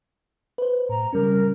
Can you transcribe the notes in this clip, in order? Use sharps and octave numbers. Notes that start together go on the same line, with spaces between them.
B4 C5
A2 A#5
C#3 G3 C#4 A#4